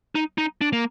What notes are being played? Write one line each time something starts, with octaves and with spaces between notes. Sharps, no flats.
D#4
D#4
D4
A#3